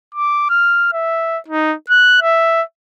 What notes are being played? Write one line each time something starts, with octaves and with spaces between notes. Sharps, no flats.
D6
F6
E5
D#4
F#6
E5